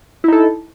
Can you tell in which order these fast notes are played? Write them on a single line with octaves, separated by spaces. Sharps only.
E4 D#4 A4